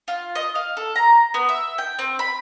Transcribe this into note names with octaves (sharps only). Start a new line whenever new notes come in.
F4
D#5
F5
A4
A#5
B3
E5
G5
C4
B5